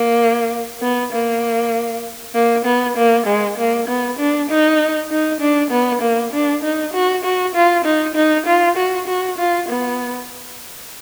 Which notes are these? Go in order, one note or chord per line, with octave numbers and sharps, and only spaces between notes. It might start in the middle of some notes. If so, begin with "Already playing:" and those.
Already playing: A#3
B3
A#3
A#3
B3
A#3
G#3
A#3
B3
D4
D#4
D#4
D4
B3
A#3
D4
D#4
F#4
F#4
F4
D#4
D#4
F4
F#4
F#4
F4
B3